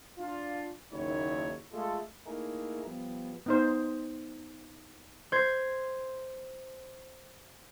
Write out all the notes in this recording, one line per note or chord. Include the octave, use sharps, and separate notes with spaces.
D4 F4
F#1 D#2 D#4 E4 C#5
G#3 A3 F4 A4
A3 A#3 D#4 E4 G#4 A#4
F3 G3 B3
B3 D#4 C5
C5 G#6